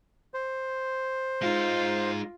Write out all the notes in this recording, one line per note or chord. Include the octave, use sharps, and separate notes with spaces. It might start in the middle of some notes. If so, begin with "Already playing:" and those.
C5
G#3 D#4 F4